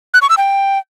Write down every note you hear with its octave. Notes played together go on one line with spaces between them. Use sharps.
F#6
C#6
E6
G5